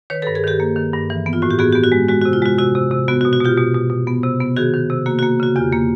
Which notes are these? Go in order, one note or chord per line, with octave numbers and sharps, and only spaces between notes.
D#3 B4 C#5
G2 A4 B4
G#4 A#4
D#3 G4 A4
A#3
D#3
G2
E3
B3
F4
A2 F#4
G4
B3 F#4 G#4
B3 G4
F#4
G#3
G#3 F#4
C3 F#4
F4
G#3 F#4
C3 F#4
C3
C3
B3 F#4
F#4
B2
F#4
B2 F4 G4
B2
B2
B2
B3
C3
B3
D#3 F#4 G#4
D#3
C3
A#3 F#4
A#3 F#4
C#3 F#4
E2 F4 G4
A#3